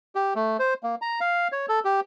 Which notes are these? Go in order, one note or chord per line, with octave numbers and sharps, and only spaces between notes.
G4
A3
C5
A#3
A#5
F5
C#5
A4
G4